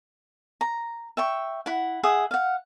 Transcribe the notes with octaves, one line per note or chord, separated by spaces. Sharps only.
A#5
E5 G5 C#6
E4 F#5
G#4 E5 F#5 D#6
F5 F#5